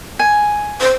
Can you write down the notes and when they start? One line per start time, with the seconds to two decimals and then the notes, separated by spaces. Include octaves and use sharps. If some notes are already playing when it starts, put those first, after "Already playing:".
0.19 G#5
0.81 C5